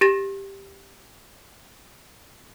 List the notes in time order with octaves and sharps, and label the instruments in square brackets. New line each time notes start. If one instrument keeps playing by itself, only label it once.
[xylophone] G4 A6 A#6 E7